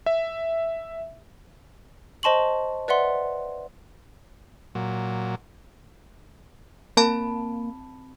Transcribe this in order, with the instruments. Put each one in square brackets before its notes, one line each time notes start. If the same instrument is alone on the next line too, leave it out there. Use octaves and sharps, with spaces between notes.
[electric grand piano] E5
[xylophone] C5 D#5 A5 C6 C#6 F#7
B4 D5 E5 F#5 C6
[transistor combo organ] A#2 F#3
[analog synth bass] A#3 [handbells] C4 A5 B5